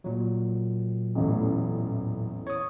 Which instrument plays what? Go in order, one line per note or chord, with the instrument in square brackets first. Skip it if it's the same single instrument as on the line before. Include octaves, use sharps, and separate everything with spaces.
[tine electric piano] A#2 F#3
[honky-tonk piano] A1 E2 A2
[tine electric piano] C#5 D#6